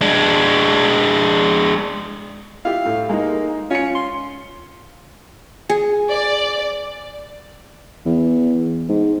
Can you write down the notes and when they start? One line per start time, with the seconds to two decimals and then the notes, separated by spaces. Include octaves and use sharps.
0.01 G#3 D4
2.65 E4 F4 G4 F5
2.85 A2
3.09 G#3 A#3 D#4
3.70 C#4 F4 C#7
3.95 C6
5.70 G#4
6.11 D5
8.05 E2
8.89 G#2